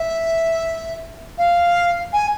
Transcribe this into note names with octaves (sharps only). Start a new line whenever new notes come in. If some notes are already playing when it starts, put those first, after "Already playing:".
Already playing: E5
F5
G#5